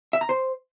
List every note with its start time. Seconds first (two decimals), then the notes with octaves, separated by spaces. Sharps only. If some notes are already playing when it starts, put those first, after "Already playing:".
0.13 E5
0.21 A#5
0.29 C5